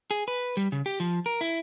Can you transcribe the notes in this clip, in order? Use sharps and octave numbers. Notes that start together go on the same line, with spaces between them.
G#4
B4
G3
C#3
G4
F3
A#4
E4